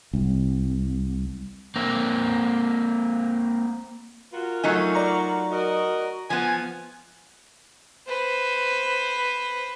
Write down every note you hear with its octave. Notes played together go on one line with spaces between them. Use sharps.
C2
A#3 C4
F4 F#4 A#4
F#3 A3 D#4 G#5
D5 A#5 C#6
F#4 A#4 D#5
F3 B3 G#5
B4 C5